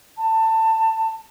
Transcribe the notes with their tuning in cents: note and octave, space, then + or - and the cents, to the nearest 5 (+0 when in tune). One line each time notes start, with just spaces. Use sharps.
A5 +20